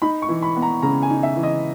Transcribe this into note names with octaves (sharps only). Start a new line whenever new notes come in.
D#4 B5
C#6
E3
B5
B3
A#5
C#3 A#5
G#5
D#4
E5
E3
D#5